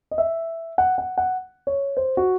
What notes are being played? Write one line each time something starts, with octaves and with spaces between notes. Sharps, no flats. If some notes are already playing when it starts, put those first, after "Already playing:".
D#5
E5
F#5
F#5
F#5
C#5
C5
F#4